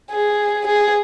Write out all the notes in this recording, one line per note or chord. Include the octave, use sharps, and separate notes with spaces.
G#4
G#4